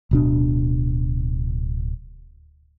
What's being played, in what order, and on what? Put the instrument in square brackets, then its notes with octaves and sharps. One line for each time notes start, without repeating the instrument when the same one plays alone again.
[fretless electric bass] D1 B2 D4